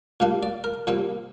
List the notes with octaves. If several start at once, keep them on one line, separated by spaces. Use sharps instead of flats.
A#2 G3 A#3 D4
D5
A#4
A#2 G3 C4